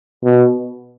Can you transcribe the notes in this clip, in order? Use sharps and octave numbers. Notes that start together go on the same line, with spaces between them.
B2